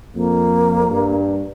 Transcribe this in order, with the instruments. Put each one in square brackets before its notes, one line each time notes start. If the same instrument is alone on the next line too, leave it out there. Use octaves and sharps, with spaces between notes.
[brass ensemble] F2 [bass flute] A#3
[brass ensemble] G2